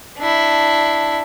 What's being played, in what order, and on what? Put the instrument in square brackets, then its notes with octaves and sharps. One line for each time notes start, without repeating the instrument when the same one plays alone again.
[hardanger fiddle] D4 E4